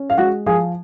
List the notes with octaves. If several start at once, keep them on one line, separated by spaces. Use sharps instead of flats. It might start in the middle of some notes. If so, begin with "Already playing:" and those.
Already playing: C#4
F5
G#3 F#4 F#5
F3 G#4 G#5